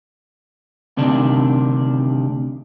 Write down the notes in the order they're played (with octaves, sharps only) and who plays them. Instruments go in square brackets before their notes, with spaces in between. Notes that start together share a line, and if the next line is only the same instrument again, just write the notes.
[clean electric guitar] D2 C3 D#3 D4